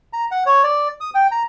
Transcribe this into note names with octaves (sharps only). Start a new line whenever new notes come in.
A#5
F#5
C#5
D5
D#6
G5
A#5